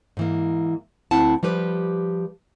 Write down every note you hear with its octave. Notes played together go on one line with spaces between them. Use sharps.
G#2 E3 A#3
D2 C4 E4 F#5 A5
F3 G3 G4 B4